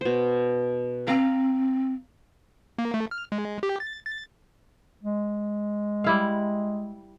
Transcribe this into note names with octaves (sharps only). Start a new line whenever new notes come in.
B2 C5
C4 F5 A#5
A#3
A3
F6
G#3
G4
A6
A6
G#3
G3 E4 F5